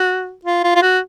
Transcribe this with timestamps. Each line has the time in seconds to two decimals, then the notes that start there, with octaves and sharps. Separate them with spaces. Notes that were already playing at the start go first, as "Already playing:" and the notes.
Already playing: F#4
0.45 F4
0.64 F4
0.76 F4
0.82 F#4